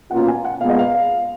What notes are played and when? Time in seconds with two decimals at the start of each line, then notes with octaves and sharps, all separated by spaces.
0.11 B2 A#3 C#4 F4 F#5
0.28 G#5
0.45 F#5
0.61 A#2 G#3 B3 F5
0.70 D#5
0.79 F5